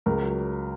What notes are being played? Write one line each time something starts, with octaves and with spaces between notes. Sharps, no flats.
C#2 A#4
F#3